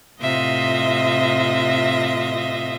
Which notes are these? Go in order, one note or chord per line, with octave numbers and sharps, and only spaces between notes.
A2 C3 F4 D#5 E5 A#6